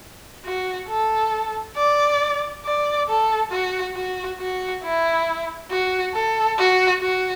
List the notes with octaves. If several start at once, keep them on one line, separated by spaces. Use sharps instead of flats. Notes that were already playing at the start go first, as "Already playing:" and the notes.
F#4
A4
D5
D5
A4
F#4
F#4
F#4
E4
F#4
A4
F#4
F#4